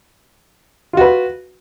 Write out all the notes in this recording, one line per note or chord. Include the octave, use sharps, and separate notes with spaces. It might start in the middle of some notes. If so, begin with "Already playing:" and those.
F4 F#4 B4